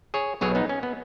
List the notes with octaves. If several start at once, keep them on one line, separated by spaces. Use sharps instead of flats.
G#4 C#5
B1 B2 F#3 G#4 C#5
B3 D#4
C#4
B3